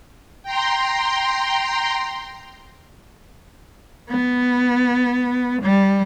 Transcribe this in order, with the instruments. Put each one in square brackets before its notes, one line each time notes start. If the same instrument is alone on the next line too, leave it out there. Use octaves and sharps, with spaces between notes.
[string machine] G5 A#5 C6
[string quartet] B3
G3